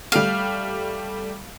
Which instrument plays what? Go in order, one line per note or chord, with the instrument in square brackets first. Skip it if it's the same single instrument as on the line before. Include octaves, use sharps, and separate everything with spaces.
[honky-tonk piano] G3 A3 [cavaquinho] F5